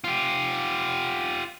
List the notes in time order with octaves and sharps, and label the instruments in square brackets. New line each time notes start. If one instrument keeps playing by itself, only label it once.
[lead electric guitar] F4 G4